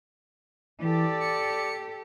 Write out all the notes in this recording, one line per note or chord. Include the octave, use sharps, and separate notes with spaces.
E3 G4 A4 D5
C#7